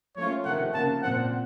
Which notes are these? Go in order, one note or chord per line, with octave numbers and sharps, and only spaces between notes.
F3 A3 C#4 F4 C#5
C3 D#3 A3 D#4 F#5
C#3 F3 A#3 A5
A#2 F3 C4 F#5